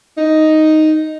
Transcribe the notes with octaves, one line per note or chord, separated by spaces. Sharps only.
D#4